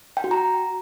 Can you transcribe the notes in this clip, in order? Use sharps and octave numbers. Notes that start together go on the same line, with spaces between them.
G5
F#4
A#5